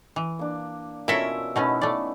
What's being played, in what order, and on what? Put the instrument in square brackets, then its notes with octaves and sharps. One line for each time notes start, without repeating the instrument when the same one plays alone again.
[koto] E3
[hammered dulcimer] A#3 D4
[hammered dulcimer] B2 C#4 F4 [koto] E4 A4 C#5 [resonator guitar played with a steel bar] A#4 E5
[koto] B2 A3 C#4 [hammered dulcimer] B3 D#4 E4
[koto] A3 D5 [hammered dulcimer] C#4